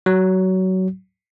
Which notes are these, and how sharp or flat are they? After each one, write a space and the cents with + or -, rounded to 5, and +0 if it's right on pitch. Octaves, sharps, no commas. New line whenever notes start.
F#3 +20